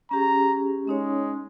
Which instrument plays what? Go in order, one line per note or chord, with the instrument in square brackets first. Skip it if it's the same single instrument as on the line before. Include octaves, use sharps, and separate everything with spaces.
[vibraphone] C#4 G4 G#4 [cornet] A#5
[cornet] G#3 [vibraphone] C#4 D#4 C#5